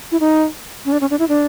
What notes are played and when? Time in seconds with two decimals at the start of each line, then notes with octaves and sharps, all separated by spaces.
0.12 E4
0.20 D#4
0.85 C#4
0.92 D4
1.01 C#4
1.10 D4
1.19 E4
1.29 D4